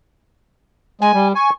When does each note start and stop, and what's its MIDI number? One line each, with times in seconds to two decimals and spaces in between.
1.01 1.12 56
1.01 1.27 80
1.14 1.33 55
1.35 1.50 80
1.35 1.52 85